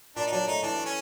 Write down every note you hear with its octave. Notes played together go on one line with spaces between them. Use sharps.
A#2 D4
D#4
F#3 D4
A3 D#4
E3 D4
A3
C#4